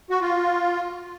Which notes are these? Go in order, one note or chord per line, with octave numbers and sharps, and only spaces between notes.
F#4
F4